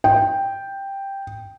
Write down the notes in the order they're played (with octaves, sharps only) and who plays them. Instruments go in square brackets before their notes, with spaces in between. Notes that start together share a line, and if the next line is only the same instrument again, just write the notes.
[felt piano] G5